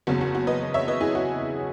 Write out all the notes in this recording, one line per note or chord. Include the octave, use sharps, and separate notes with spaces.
F#1 E2 C#3 F#4
F#4
F#4
B4 D#5
C#5 E5
B4 D#5
E4 G#4
F#4